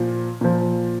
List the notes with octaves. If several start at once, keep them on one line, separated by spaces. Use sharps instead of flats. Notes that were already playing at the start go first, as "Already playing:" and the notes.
Already playing: A#2 F3
A#2 F3